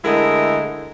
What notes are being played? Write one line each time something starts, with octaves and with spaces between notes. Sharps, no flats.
D3 G#3 A3 E4 A#4 D#5